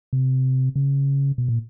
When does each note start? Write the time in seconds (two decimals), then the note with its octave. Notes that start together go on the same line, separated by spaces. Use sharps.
0.13 C3
0.76 C#3
1.38 B2
1.48 A#2